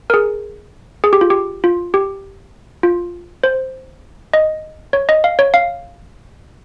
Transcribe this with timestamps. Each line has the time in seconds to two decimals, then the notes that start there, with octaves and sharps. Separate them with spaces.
0.10 A#4
0.14 G#4
1.04 G#4
1.13 G4
1.21 F4
1.30 G4
1.64 F4
1.94 G4
2.83 F4
3.44 C5
4.33 D#5
4.93 C#5
5.09 D#5
5.24 F5
5.39 C#5
5.54 F5